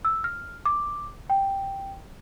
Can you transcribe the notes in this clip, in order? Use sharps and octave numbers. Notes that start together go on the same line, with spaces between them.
E6
F6
D6
G5